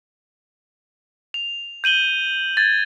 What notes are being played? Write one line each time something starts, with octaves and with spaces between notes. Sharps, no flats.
F7
G6 D#7 F#7 G7
G#6 A6